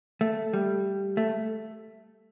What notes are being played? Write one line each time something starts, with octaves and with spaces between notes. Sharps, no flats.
A3
G3
A3